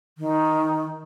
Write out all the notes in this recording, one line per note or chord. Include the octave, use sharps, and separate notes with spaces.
D#3